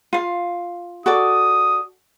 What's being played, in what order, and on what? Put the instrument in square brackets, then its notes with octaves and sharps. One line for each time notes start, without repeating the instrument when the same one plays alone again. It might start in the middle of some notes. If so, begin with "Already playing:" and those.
[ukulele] F4 F5
[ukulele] F#4 A4 D5 [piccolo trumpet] D#6